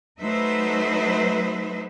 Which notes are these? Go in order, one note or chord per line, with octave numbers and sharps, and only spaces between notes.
F#3 A3 D#4 B4 C5 E5